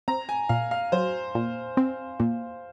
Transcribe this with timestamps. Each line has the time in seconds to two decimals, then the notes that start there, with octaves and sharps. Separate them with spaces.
0.08 C4 A#5
0.29 G#5
0.49 A#2 F5
0.71 F5
0.92 F#3 C5
1.35 A#2
1.77 C4
2.20 A#2